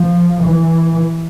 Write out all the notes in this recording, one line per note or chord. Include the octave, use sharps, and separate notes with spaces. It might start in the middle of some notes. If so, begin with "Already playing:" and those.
Already playing: F3
E3